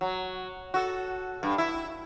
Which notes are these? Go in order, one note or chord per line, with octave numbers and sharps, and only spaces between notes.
F#3
F#4 A4
G2
E4